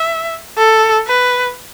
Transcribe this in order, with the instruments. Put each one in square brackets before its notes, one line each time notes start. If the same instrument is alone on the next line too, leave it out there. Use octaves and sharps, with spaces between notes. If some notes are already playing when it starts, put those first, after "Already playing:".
Already playing: [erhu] E5
A4
B4